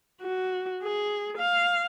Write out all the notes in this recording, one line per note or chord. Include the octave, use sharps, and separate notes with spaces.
F#4
G#4
F5